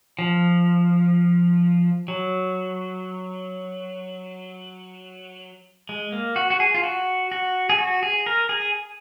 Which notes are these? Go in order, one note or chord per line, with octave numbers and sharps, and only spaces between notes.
F3
F#3
G#3
A#3
F#4
F#4
G#4
F4
F#4
F#4
G#4
F#4
G#4
A#4
G#4